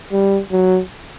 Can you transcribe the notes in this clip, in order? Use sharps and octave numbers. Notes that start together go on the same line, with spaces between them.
G3
F#3